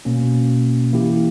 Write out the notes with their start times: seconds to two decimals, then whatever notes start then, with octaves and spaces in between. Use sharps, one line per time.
0.05 B2 A#3 C#4
0.93 E3 A#3 E4 G4